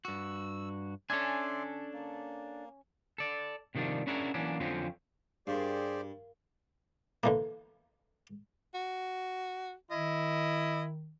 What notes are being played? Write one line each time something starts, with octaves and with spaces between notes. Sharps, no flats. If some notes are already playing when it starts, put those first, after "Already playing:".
G2 F#4 E6
C#4 D4 A4 D5 E5 G#5 C6
A#3
A4 D5
C3 D#3 F3 G3 D4
C#4 D4 E4 F#4 G#4 A#4
E3 F#3 A#3 C#4 D4
F2 D3 F3 F#3 C4 C#4
G2 G4 G#4 A#4 C5 D5 F5
D3 E3 A#3
F#4
D#3 E4 D#5